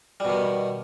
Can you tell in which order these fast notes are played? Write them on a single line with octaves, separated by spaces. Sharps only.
G3 B2 D#3